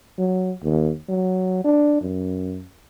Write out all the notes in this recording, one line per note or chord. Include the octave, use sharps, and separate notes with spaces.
F#3
D#2
F#3
D4
F#2